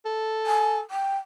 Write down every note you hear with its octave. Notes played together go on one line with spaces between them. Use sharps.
A4
G#5
G5